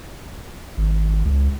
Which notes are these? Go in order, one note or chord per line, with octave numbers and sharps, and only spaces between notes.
G#1
C#2